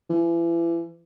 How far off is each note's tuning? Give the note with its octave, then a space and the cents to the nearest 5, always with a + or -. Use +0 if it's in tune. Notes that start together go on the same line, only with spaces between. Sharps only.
E3 +35